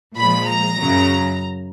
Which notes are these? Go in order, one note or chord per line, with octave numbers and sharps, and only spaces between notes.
A#2 F3 G#3 B5
A#5
F#2 C#3 F#3